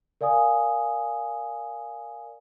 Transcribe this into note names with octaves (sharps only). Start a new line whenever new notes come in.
A#4 D5 F5 G#5 D#6